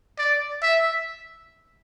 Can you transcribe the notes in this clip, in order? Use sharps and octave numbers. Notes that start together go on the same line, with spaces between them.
D5
E5